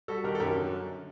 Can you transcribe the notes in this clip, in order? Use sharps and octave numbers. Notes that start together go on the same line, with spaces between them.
G3 F#4 A4
D#3 G4 A#4
A4
F#2 G4 A#4
D3